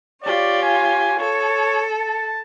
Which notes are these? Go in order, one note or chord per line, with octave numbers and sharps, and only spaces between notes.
F4 G4 C#5 D5
G#5
A4 C#5
A5